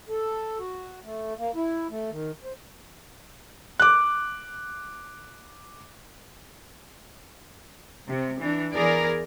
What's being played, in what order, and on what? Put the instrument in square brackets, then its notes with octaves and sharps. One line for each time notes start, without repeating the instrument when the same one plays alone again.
[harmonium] A4
F#4
A3
A#3
E4
A3
D#3
C5
[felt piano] D6 F#6
[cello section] C3
E3 D4
E2 E3 G#4 A#4 D5